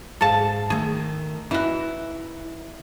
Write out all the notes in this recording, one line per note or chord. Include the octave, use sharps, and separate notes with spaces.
G#2 G#4 A4 F5 A5
D#3 A3 G#4
E3 D#4 E4 F#4